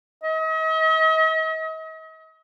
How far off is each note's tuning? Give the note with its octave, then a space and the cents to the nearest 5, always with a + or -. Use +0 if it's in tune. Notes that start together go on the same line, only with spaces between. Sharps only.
D#5 +40